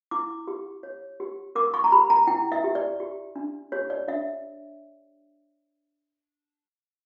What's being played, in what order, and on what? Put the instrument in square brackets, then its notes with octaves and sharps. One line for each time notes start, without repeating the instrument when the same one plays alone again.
[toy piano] E4 D6
G4
C#5
G4
A#4 D6
C#6
A#5
G4 B5
A#5
E4 G5
E5
G4
D5
G4
D4
G4 C#5
D5
D4 E5